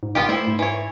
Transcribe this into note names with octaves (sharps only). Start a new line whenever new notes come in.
G#2
F#1 B3 F4 G4
A3 E4 C5
G#2
E3 C#5